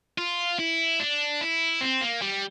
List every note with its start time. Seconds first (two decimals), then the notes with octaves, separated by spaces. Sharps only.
0.18 F4
0.59 E4
1.00 D4
1.41 E4
1.81 C4
2.01 A#3
2.22 G3